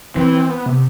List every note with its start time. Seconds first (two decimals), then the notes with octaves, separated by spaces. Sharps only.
0.15 E3 C4
0.33 C4
0.49 B3
0.66 C3